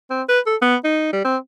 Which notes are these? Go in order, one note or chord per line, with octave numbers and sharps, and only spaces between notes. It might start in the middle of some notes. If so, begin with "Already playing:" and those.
C4
B4
A4
B3
D#4
G3
C4